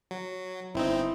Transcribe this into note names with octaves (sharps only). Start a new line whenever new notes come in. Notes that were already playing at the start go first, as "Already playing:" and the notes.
F#3
G1 C4 D#4 E4